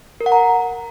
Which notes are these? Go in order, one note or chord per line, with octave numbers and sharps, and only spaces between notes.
A#4
F#5
A#5